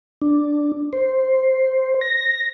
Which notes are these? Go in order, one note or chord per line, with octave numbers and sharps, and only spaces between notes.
D4
C5
A#6